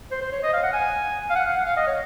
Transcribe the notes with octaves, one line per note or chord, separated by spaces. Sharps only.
C5
C5
C#5
D#5
F5
F#5
G#5
F5
F#5
F5
F#5
F5
D#5
C#5